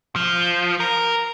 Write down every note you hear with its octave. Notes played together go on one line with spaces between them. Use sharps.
F3
A#4